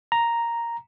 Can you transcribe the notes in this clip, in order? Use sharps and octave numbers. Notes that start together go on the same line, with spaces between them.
A#5